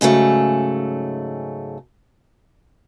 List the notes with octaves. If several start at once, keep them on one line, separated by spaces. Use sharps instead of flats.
G#2 C#3 F#3 A3